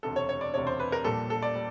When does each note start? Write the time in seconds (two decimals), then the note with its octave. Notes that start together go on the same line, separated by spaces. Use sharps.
0.03 E1 D2 C3 A4
0.16 C#5
0.29 C#5
0.41 D5
0.54 E1 D2 C3 C#5
0.67 C5
0.80 B4
0.92 A#4
1.04 A#1 A#2 G3 A4
1.30 A4
1.42 D5
1.55 G3